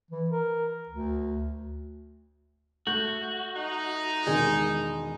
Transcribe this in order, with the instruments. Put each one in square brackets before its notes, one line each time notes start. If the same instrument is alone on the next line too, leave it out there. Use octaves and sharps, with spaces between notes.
[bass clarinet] E3
A#4
D2
[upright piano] A3 G6 [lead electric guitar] F#4
[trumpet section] D#4
[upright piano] E1 D#3 [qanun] G#3